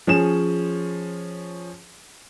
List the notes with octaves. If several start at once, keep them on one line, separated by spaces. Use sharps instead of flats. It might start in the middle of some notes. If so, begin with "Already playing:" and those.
F3 C#4 G#4 C#5 E7